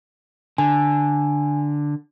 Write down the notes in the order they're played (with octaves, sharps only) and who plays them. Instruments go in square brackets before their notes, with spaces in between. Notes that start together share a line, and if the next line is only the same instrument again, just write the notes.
[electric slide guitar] D3 [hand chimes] G#5